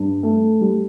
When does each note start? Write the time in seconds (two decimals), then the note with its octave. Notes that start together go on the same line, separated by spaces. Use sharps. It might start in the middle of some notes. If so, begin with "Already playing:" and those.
Already playing: G2
0.23 A3
0.61 G3